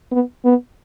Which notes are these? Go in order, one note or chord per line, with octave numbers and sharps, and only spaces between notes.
B3
B3